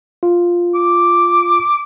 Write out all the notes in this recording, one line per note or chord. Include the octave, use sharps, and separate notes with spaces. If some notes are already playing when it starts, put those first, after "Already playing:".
F4
D6